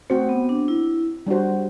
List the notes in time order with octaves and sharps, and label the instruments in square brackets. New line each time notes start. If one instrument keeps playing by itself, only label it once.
[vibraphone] A3 [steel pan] C4 F#4 C5
[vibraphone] B3
D4
E4
[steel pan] G3 D4 F#4 C5